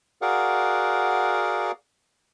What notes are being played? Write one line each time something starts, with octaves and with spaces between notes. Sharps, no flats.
F#4 G#4 A#4 D5 F5 F#5